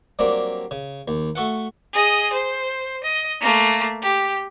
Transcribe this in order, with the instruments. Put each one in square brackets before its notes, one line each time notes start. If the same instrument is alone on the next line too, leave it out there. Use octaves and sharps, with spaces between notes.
[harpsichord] F#3 G3 A#3 C4 D4
C#3
D#2
A3 F#4 A4 F#5
[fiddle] G#4 D#5
C5
D#5
A3 A#3
G4